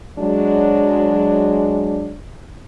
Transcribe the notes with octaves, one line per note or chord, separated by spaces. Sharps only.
F#3 G#3 D4